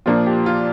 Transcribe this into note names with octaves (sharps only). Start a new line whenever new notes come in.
A#2 F3 A#3 D4 F4
G4
F4